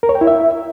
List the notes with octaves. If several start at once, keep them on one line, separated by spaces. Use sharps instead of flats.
A#4
C#5
G5
E4
E5